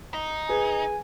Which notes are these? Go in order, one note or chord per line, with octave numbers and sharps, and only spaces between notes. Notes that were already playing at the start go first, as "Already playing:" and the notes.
D#4
G#4 B4 G#5